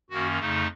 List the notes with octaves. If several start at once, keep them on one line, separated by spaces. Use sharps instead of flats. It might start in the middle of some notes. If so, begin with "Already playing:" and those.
F#2 D#3 A#3 C#4 F#4
F2 C#3 A3 D#4